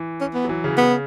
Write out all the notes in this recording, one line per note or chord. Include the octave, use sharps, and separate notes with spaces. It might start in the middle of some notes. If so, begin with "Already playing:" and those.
Already playing: E3
C#4
B3
F#3
E3
C#3
B3